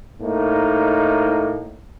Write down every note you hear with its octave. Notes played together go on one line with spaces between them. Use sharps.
A2 A#3 D#4